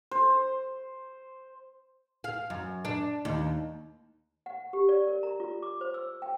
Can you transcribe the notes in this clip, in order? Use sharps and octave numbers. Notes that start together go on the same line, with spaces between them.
C5
F5
F#2
D4
D#2
F#5
G4
D5
A#4
A#5
F4
D6
C5
E6
G5